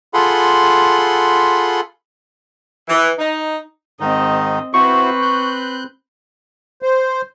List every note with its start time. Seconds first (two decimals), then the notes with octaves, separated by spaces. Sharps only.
0.14 F4 G#4 A4 F#5 B5 C6
2.89 E3
3.19 D#4
4.00 G#2 D#3 C4 D#4 D#5
4.74 C4 E4 F#4 B4 C5 C#6
5.22 F#6 G6
6.82 C5